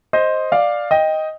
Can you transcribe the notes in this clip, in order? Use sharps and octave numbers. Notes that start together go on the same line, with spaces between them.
C5 D#5
D5 F5
D#5 G5